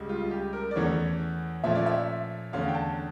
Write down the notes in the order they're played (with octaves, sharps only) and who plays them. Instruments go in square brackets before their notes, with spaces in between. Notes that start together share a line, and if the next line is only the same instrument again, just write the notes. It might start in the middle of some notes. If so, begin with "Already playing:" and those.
Already playing: [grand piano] C#2 C#3 G3
F4
G4
A#4
D5
E2 E3 A3 C#4 C#5
A#2 F3 A3 C#4 E5
D5
E5
E2 D3 A3 C#4 F5
G5
A5